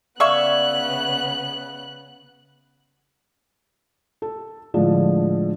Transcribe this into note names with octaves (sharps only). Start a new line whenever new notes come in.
C#3 B3 D5 E5 F5 C#6 F#6 G#6
A4
A2 D3 F3 G#3